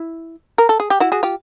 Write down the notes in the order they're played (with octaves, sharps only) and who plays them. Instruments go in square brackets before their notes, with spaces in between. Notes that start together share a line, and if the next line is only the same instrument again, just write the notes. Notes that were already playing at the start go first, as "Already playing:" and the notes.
Already playing: [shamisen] E4
A#4
A4
G#4
G4
E4 F#4
F#4 G#4
F4 G4